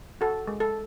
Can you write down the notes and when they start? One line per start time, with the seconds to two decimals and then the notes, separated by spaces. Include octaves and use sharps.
0.21 F#4 A4
0.47 G#3
0.60 A4